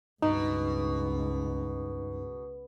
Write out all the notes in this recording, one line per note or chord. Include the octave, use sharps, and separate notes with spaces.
C#2 G2 B2 D#4